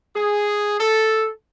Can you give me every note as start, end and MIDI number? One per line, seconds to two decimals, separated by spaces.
0.16 0.77 68
0.80 1.29 69